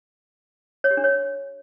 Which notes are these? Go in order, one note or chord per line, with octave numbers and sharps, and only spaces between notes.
C#5
G4
D4
C#5